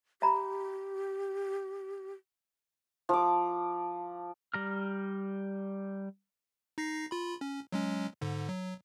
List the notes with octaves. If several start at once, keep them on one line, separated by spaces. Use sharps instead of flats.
G4 E5 A#5 B5
F3 D6
G3 A#5 F6
D#4 A#6 C7
F4 B5
C#4
F#3 G#3 C#4
G#2 D3
F#3